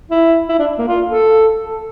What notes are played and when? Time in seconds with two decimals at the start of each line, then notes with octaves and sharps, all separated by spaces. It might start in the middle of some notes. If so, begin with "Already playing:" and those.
0.11 E4
0.49 E4
0.59 D4
0.79 A#3
0.88 F4
1.07 A4
1.65 A4